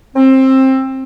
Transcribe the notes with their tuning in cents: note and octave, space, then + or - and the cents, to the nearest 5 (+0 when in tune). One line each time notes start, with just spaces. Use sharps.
C4 +20